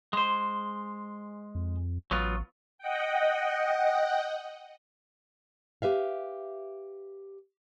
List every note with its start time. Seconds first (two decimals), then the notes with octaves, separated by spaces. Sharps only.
0.13 G#3 C5
1.55 F2
2.11 A1 F#3 B3 F4
2.78 D#5 F#5 G5
5.82 G4 B4 E5 F5